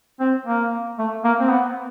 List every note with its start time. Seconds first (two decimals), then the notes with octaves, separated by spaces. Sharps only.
0.20 C4
0.46 A#3
0.98 A3
1.24 A#3
1.40 C4
1.50 B3